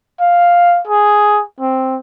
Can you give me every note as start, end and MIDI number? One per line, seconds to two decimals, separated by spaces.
0.20 0.81 77
0.88 1.42 68
1.60 1.98 60